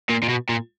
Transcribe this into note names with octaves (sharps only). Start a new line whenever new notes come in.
A#2
A#2
B2
A#2